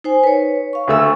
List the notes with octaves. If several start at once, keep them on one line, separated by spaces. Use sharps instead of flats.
D#4 C5 G#5
B4 C#5
F5 C#6
D2 A3 E6